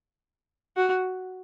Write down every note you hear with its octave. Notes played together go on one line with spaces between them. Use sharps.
F#4